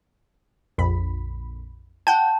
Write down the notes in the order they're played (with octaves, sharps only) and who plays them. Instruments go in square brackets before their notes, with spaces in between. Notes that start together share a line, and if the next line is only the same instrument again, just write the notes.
[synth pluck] A#1 F2 B5
[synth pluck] F#5 G5 G6 [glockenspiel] A5